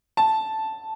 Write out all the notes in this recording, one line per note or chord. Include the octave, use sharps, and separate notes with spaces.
A5